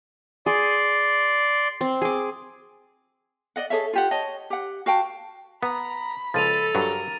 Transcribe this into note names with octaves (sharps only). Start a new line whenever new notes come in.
G#4 D5 C6
C4
G#4 D6
D5 D#5 F#5
G#4 A4 C#5 E5
F4 G4 F#5
C#5 D#5 A5
G4 F#5
F#4 F5 G5 A5
B3 A#5 B5
C#2 F3 A4 A6 D#7 F7
G2 F#3 A#4